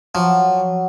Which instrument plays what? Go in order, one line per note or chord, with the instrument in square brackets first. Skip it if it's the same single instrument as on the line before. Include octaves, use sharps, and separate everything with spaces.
[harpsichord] F3 [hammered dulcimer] F#3